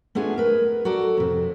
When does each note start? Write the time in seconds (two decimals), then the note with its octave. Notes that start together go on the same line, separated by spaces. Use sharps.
0.15 A3 B3 D4 F4 G#4
0.38 A#4 B4
0.85 F#4 A4 A#4 D5
1.17 F2 C3